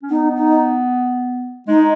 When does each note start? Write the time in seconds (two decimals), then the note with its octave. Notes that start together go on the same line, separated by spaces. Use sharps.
0.02 C#4
0.10 B3 D#4
0.36 D#4
1.68 G#3 D#4